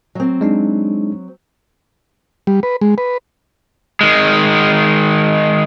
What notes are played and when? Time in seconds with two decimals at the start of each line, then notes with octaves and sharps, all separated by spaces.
0.15 F#3 C4
0.41 G#3 D4 D#4
2.47 G3
2.63 B4
2.81 G#3
2.98 B4
4.01 D#3 G#3